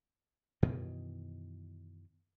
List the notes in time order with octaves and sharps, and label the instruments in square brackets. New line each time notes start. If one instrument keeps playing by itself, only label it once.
[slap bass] F#2 B2 D#3 E3